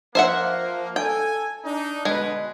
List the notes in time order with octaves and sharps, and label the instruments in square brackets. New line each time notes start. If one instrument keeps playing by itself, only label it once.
[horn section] F3 A#3 [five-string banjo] C5 E5 F#5
[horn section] A4 G#5 [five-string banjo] G5
[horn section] D4 D#4
[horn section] B2 D3 B4 [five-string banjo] G#3